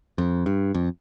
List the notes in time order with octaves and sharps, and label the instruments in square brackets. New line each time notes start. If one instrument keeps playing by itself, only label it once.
[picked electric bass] F2
G2
F2